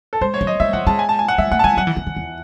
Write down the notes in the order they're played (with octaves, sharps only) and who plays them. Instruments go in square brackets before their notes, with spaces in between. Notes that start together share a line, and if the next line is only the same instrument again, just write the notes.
[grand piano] A4
[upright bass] G#3 [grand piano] C5
[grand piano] C#5
[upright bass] F#3
[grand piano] D#5
[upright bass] G#3 [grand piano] E5
[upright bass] F#3 [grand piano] F#5
[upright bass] G#3 [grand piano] A5
[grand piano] G#5
A5
G#5
F#5
[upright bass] G#3 [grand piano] E5
[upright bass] A3 [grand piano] F#5
[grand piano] A5
[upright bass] G#3 [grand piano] G#5
[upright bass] F#3 [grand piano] F#5
[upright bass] E3
D#3
D#3
E2